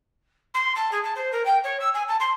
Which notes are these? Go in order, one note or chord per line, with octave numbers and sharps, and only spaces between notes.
C6
A5
G#4
A5
C5
A#4
G5
C#5
E6
G#5
A5
C6